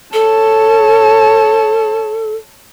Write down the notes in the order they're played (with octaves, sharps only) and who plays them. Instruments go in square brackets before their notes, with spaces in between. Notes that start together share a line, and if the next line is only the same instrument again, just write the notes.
[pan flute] A4 [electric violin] C#5 A5